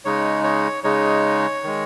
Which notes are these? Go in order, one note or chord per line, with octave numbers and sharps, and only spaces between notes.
C#3 G#3 D#4 C#5
C#5
C#3 G#3 D#4 C#5
D#3 G#3